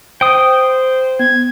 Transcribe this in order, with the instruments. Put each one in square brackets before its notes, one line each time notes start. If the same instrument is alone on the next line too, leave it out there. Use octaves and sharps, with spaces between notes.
[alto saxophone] C5 [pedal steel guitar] G5 D#6
[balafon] B3 [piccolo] G#6